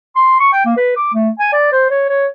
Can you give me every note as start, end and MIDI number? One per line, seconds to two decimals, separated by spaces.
0.16 0.35 84
0.40 0.49 85
0.52 0.64 79
0.65 0.74 58
0.77 0.92 71
0.97 1.13 86
1.13 1.30 57
1.39 1.52 80
1.53 1.69 74
1.72 1.90 72
1.90 2.05 73
2.09 2.27 73